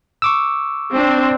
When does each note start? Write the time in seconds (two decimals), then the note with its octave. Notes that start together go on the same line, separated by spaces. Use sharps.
0.22 C#6 D6 E6
0.91 C4 D4